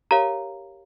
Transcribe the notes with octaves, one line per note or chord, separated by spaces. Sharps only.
G4 A#4 C#5 F5 A#5